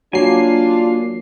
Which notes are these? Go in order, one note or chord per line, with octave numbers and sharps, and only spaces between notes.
F#3 A#3 D4 F4 G#5 C7